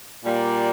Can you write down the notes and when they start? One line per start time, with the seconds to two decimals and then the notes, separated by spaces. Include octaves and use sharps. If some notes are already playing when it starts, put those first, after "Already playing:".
0.25 A#2 G3 A#3